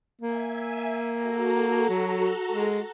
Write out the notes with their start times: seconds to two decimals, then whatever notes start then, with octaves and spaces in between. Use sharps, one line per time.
0.21 A#3 E5 G#5
1.13 F#4 A4 A#5
1.90 F#3
2.52 G#3